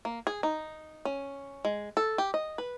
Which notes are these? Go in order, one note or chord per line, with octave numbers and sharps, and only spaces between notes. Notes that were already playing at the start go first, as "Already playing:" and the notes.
A#3
G#4
D#4
C#4
G#3
A4
G4
D#5
B4